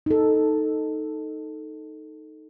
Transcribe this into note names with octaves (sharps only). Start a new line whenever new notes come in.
D#4 A4